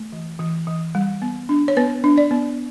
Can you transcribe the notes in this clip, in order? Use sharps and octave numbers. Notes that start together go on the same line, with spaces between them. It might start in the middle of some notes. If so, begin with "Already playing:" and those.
Already playing: A3
E3
E3
E3
G3
B3
D4
C#5
B3 B4
D4
D5
B3